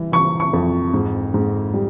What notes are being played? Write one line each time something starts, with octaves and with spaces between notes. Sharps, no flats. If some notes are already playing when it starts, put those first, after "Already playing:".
Already playing: E3 G3
E3 C#6
C#6
F2
G#2
G#2
G3